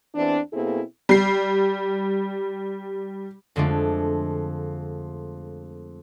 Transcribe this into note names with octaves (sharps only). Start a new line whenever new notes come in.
E2 E3 C4 D4
B2 A#3 C4 E4 G#4 A4
G3 C7
F2 D3 G#3 A3 D4 F4